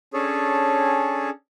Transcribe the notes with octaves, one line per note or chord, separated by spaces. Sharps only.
C#4 D4 G#4 A4 C#5